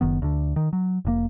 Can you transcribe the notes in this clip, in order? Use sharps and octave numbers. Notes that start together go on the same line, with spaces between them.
F#1 D#3 B3
D2 D3
D#3
F#3
F1 C3 A#3